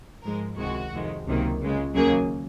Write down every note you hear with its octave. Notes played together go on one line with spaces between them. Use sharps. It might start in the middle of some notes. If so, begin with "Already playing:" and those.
G#2 F3 G#3 A#4
C#2 C3 D#3 G#3 F#4
F2 C3 D#3 G#3
C#2 C3 D#3 F#3 A#3
C#2 C#3 G#3
D#2 C#3 F#3 A#3 G#4